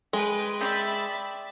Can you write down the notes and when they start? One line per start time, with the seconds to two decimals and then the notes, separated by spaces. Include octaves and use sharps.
0.13 G#3 B4 G5
0.61 D5 E5 G5 B5 A6